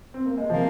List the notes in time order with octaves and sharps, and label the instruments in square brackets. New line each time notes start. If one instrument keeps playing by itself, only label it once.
[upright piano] C4
A#3
G#3
[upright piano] C3 F3 [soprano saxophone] A#3